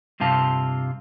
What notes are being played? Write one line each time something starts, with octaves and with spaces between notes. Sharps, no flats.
G2 C3 F4 A5